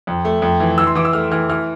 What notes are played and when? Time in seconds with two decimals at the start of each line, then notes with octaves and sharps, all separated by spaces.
0.07 F2
0.25 A3
0.42 F2
0.60 E3
0.78 E3 E6
0.87 C6
0.95 E3 D6
1.05 E6
1.13 A3 F6
1.31 E3 F6
1.49 E3 F6